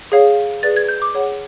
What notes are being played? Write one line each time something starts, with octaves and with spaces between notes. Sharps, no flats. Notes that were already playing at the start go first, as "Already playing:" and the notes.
G#4 C#5 F5
G#4 B4 D5 A6
G#6
G6
D6
G#4 C#5 F#5